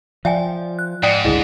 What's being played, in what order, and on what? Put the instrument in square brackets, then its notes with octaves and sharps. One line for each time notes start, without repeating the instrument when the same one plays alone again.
[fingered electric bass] F3 [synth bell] D5 [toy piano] E5 G5 G#5
[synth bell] F#6
[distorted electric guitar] G#2 [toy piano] D5 G5 D#6
[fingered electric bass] G1 C#2 D3 [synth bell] E4 [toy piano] G#4 D#5